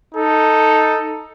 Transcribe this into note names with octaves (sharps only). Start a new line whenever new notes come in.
D#4 A4